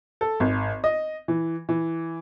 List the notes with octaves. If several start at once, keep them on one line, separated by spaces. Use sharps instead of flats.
A4
G#1
D#5
E3
E3